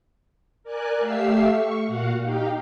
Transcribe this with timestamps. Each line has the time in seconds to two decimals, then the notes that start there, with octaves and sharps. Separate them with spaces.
0.63 A#4 D5 G#5 F#6
0.99 A3 G4 E5 F5 E6 C7
1.49 C#6
1.84 A#2 F#4 F5 F#5
2.22 D#4 G4 F5 G5